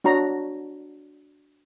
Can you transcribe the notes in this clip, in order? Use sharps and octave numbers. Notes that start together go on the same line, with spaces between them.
D4 F#4 C#5 A#5